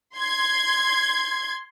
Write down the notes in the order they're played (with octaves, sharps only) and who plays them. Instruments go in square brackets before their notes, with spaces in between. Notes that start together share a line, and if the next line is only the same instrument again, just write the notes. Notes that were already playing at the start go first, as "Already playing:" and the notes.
[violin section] C6 G#6